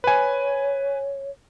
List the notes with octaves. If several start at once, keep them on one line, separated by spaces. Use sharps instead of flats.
B4 C#5 G#5